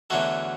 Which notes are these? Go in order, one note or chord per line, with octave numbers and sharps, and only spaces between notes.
E2 D3 F#3 A3 F#4 A4